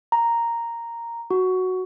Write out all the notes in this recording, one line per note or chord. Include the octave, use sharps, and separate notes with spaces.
A#5
F#4